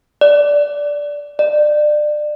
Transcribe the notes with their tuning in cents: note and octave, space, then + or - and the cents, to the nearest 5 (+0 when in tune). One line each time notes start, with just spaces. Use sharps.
D5 -10
D5 +25